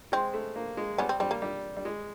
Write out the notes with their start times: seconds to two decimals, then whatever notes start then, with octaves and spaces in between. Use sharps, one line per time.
0.12 G#3 C4
0.34 A3
0.56 A#3
0.77 G#3
0.98 G3 B3 C#4
1.09 C4
1.20 G3 C4
1.31 A#3
1.42 G3
1.77 G3
1.85 G#3